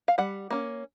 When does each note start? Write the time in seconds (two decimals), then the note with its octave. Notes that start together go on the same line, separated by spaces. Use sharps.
0.08 F5
0.18 G3 F#5
0.51 A#3 C#4